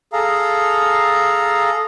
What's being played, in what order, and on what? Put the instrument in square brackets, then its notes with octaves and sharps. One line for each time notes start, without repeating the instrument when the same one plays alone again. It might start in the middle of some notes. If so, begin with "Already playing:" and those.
[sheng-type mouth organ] G#4 A4 F5 A#5